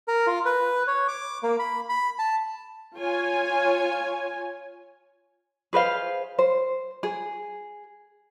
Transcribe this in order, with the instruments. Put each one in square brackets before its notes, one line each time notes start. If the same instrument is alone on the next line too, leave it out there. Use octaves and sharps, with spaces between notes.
[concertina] A#4
F4
B4
C#5
D6
A#3
B5
B5
A5
[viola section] F4 C#5 G#5
[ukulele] G#4 B4 C5 F5
C5
G#4